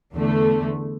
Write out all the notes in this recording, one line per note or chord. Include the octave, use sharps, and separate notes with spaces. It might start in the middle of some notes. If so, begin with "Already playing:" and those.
E2 D3 A3